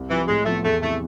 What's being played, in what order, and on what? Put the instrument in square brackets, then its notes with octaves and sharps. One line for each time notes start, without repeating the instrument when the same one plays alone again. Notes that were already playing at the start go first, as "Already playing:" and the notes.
Already playing: [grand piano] C2
[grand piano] C3 F3 [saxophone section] E3
[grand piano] A2 [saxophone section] G#3
[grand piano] F3 B3 [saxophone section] A3
[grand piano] E2 [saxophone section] A3
[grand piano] C3 E3 [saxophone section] A3